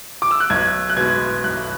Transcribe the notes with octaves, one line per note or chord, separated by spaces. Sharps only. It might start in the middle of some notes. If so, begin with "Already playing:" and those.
D6
E6
F#6
B1 G#6
F#6
B2 G#3 G#6
B1 F#6